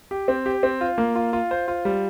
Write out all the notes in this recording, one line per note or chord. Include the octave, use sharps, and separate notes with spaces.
G4
C4
G4
C4
F4
A#3
F4
F4
C5
F4
G3